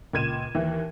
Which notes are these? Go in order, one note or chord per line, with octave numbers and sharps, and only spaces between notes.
C#2 A#2 G#6 D#7 E7
D#2 E3